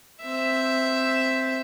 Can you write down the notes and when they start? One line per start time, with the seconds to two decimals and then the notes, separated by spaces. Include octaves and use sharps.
0.21 C4 E5